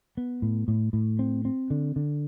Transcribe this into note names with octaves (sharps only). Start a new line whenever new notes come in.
B3
A2
A2
A2
C4
C4
D3
D3